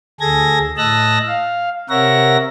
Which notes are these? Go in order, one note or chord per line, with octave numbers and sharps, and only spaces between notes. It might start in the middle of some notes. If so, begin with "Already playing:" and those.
D2 G#4 A4 G#6 A#6
A2 D#5 A5 E6 F#6 A#6
F5
C3 A#4 C#5 E5 F#5 A#6